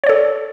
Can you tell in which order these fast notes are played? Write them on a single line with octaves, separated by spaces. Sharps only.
C#5 D5 A4